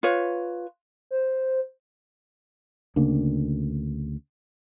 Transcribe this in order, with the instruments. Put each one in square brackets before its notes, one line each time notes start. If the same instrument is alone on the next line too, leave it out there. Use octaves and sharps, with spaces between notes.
[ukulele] F4 B4 C#5
[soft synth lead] C5
[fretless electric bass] D2 C#3 A#3 D4